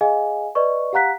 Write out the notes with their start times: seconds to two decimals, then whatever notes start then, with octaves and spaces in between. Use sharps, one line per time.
0.01 G#4 D#5 F5 G#5
0.55 B4 D5 D#5 C#6
0.93 G4 F5 F#5 A#5 F#6 B6